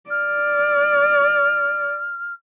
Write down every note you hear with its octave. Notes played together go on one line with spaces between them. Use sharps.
D5 F6